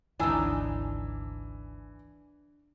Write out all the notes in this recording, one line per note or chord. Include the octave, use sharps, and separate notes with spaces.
G#1 D2 E3 C4 D4 D#4 G#5 E6